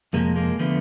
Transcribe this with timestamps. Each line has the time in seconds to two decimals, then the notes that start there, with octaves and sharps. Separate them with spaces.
0.13 F2 C3 F3 G#3 A#3
0.36 G#3 A#3
0.59 D3 F3 A3 B3